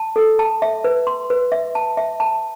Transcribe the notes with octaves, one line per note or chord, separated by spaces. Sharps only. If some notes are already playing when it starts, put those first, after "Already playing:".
Already playing: A5
A4
A5
E5
B4
C6
B4
E5
A5
E5
A5